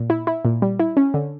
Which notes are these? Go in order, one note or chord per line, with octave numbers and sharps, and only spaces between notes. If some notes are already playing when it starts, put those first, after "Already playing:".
Already playing: A#2
E4
E4
A#2
G3
E4
C#4
D3